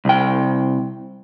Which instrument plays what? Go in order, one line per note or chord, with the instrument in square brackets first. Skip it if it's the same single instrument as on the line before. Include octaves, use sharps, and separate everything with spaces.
[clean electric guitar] C2 G5